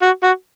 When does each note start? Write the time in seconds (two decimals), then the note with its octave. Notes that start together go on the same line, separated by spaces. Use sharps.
0.02 F#4
0.23 F#4